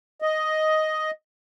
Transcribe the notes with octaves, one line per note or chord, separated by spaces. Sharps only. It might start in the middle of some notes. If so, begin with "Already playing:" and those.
D#5